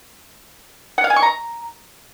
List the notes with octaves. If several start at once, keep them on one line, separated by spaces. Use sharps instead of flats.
F#5
F5
G#5
C#6
A#5